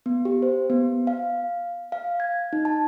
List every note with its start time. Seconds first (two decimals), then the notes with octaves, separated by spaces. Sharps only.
0.06 B3
0.25 G4
0.42 C5
0.70 B3
1.07 F5
1.92 F5
2.20 G#6
2.53 D#4
2.65 A5